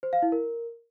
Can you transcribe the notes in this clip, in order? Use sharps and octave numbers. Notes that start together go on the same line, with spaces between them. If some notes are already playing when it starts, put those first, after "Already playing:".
C5
F5
E4
A#4